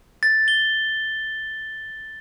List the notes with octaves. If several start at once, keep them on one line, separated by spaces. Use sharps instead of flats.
A6
G7